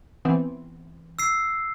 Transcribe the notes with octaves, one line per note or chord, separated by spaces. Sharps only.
E3 B3 C4
E6 C7